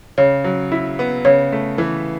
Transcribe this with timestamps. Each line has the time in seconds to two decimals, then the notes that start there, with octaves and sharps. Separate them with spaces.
0.18 C#3 C#5
0.44 F#3
0.72 E4
0.99 B3
1.25 C#3 C#5
1.52 A3
1.78 E3